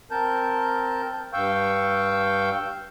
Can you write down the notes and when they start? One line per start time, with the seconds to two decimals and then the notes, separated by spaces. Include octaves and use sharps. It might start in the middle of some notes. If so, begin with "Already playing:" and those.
0.11 C4 A#4 A5 G6
1.33 G2 F5 G5 C#6 E6 G6